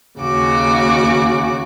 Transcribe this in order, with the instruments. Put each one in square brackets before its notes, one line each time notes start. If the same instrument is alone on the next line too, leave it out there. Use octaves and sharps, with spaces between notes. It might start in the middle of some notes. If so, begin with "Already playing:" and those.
[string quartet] D#2 C#3 F#4 D6